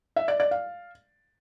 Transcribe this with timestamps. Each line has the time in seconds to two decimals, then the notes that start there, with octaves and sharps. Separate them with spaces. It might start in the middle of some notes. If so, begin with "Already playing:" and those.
0.16 E5
0.28 D5
0.40 D5
0.51 F5